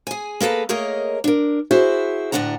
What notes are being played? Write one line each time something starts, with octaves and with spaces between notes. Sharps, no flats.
G#4 G#5
A#3 G#4 A4 B4 A#5
A3 A#3 G#4 A#4 C#5 D#5
D4 A#4
E4 F#4 G#4 C5
D2 A2 A#3 D4 F#5 A#5